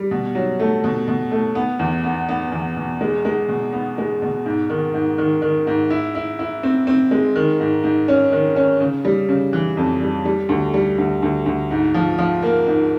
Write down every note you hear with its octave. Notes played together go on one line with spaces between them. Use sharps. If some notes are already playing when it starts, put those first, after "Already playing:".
Already playing: G3
B2
F#3
A3
B2
B2
A3
B3
E2
B3
B3
E2
B2
G#3
G#3
B2
B3
G#3
B2
G#2
D#3
G#2
D#3
D#3
G#2
E4
E4
E4
C4
C4
G#3
D#3
G#2
G#2
C#4
D#3
C#4
C#3
G3
C#3
E3
F2
G3
G3
D2
G3
D2
D2
D2
G#2
F3
F3
A#3
G#2